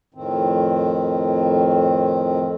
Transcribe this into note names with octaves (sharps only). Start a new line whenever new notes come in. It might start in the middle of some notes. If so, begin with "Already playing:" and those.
F2 A2 D#3 C4